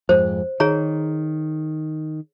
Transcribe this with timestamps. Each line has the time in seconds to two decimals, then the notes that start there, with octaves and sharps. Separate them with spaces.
0.09 F2 G#2 C5
0.60 D#3 G#4 C#5 A#5